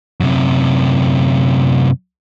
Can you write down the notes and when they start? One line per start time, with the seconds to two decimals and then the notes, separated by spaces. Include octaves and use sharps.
0.20 F#2 C3